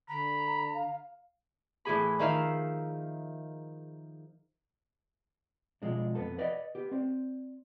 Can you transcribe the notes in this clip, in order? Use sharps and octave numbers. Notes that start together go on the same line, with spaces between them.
D3 A#5 B5
F5
A2 E3 G#4 B5
D#3 F3 D#4 A#4 E5 F5
B2 F3 G#3 D4
F2 B3 A4 A5
B4 D5 D#5 F#5
B3 G4
C4 D5